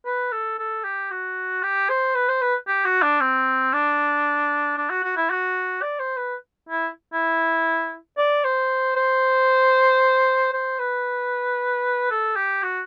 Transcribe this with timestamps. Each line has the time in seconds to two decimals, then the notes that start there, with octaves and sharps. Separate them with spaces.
0.06 B4
0.32 A4
0.59 A4
0.84 G4
1.10 F#4
1.63 G4
1.89 C5
2.15 B4
2.29 C5
2.42 B4
2.67 G4
2.85 F#4
3.03 D4
3.21 C4
3.73 D4
4.77 D4
4.90 F#4
5.04 F#4
5.17 E4
5.30 F#4
5.82 D5
6.00 C5
6.17 B4
6.69 E4
7.13 E4
8.17 D5
8.44 C5
8.96 C5
10.53 C5
10.79 B4
12.11 A4
12.36 G4
12.63 F#4